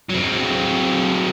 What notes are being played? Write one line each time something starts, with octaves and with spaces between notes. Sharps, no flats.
F#3 C4